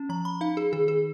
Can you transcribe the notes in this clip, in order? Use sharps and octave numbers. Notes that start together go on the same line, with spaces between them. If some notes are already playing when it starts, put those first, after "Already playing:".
Already playing: C#4
F3 A#5
B5
D#4 F5
G#4
D#3 G#4
G#4